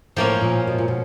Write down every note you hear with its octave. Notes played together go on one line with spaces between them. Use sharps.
A2 F3 A#3 C#4
A#2
B2
A#2
B2